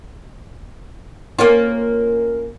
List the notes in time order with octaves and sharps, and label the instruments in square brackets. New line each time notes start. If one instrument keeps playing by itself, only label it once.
[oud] A#3 C#4 F4